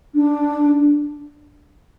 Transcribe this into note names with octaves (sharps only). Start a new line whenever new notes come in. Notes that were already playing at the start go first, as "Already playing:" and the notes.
D4